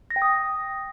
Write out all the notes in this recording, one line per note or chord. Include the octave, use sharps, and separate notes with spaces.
A#6
G5
D#6